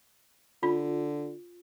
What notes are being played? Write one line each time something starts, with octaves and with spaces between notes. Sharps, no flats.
D3 F4